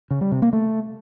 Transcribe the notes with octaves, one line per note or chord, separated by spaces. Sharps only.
C#3
G3
C3
A#3
A3